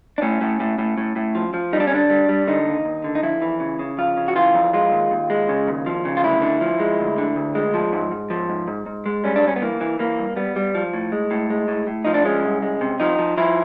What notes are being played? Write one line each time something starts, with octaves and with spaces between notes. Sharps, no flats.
D4
A2 C#4
A2
A2
A2
A2
A2
F3
F3
G3 D#4
D4
C#4
D3 D4
G3
G3
D3 D#4
D#2
D#2
D3
D#4
F2 E4
E3
C#3
C#3
F2 F4
C#3
F#4
E3 F4
F2
G#3 F4
D#2
D#2
G#3
C#3
D#2
F3
C#3
F4
D2 E4
D3
F3
G#3
D2
D3
D2
G#3
F3
G#2
G#2
F3
G#2
G#2
G#2
G#3
G3 C#4
D4
G2 C#4
B3
E3 A#3
E3
E3 A#3
G2
G3 B3
G3
F3
A2
G#3
A2
G#3
A2
A2
F3 D#4
D4
G#3 C#4
C2
G#3
C3
F3 D#4
F3
F3 E4